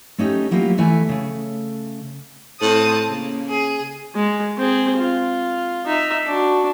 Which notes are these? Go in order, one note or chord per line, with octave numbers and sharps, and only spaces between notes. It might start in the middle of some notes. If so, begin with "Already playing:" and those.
A3 C#4 D#4 G4
F#3 A#3 E4 F4 G4
E2 E3 A3 E5 G#5
C#3 A3
A2 C4 A5 D#6
C#3 A#3
G#4
G#3
C4 G#4
F4
D#4 E5
D4 F#4